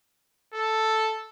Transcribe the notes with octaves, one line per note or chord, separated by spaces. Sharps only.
A4